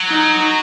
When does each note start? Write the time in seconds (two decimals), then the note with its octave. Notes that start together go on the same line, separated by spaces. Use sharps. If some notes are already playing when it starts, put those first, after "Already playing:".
Already playing: F#3
0.09 D#4